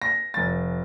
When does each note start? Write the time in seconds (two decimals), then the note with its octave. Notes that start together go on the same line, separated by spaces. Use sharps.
0.02 A#6
0.34 F1 A6